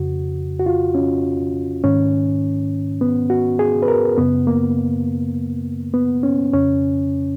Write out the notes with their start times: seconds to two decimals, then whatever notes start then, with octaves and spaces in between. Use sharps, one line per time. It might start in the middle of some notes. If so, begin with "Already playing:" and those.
Already playing: F2 C#3 F#4
0.60 F#4
0.66 F4
0.95 C#4
1.84 G#2 D#3 C#4
3.01 B3
3.30 F#4
3.59 G#4
3.82 B4
3.88 A#4
4.18 F#2 C#3 B3
4.47 A#3
5.94 B3
6.23 C#4
6.53 F2 C#3 C#4